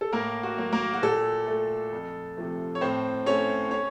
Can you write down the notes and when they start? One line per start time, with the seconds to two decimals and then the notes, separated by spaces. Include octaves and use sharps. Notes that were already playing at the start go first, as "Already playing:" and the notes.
0.01 A4
0.13 A2 A#3 A#4
0.43 F#4
0.58 F#3 A#3
0.73 A#3 A#4
0.94 F#4
1.02 A#2 A4
1.47 A3
1.93 F2
2.37 C3 F3 A3
2.75 C#5
2.81 A2 C4 C5
3.26 A3 C#4 C#5
3.71 C#4 C#5